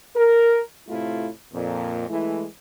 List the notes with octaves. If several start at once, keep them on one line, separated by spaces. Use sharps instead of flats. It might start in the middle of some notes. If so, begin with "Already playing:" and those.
A#4
A2 C3 A3 E4 F4
F2 A#2
E3 G#3 A3 E4